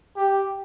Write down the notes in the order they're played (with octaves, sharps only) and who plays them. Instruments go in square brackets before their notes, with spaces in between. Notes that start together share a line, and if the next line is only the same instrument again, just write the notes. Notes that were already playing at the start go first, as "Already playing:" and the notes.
[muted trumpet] G4